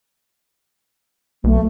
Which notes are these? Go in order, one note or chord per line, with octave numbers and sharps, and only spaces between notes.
B1 A3